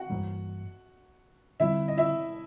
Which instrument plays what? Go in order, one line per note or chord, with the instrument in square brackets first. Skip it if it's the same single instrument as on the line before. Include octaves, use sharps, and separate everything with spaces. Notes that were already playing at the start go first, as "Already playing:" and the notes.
Already playing: [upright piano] F#4 F#5
[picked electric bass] G2 E3 G3 A#3
[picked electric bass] D3 G3 C4 [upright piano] E4 E5
[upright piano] D#5
E4 E5